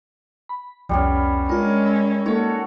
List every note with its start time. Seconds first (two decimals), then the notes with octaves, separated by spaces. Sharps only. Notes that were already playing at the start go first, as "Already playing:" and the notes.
0.49 B5
0.89 C2 F2 G3 B3 C#4
1.49 G#3 C#4 D4 F4 A#4
1.85 B5 E6
2.26 A#3 D#4 F#4 A4 C#5 F#5